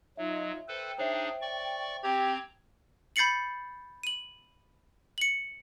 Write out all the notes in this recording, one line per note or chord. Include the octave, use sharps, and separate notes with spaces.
F#3 D#4 F4 D#5 E5
A4 B4 C5 G5
D4 D#4 G#4 C5 C#5 E5
D5 C#6
C4 G4 A#5 G#6
B5 G6 A6 C7 C#7 F#7
D#7 F#7
C#7 F#7